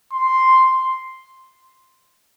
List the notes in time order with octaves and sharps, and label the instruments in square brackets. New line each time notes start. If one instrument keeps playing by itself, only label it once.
[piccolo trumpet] C6